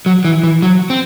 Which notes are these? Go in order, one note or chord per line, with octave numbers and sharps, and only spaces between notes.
F#3
E3
E3
F#3
C4